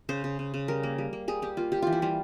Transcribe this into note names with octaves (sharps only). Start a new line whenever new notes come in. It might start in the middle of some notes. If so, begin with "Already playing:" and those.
C#3 C5
C#3
C#3
C#3
G3 A#4
A#3
G3
A#3
G3 G#4
G3 G4
A#3 F4
G3 G4
E3 F4
E4
G3 F4